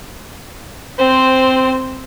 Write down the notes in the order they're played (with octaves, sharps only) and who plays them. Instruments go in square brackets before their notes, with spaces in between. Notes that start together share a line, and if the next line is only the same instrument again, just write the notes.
[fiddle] C4 C5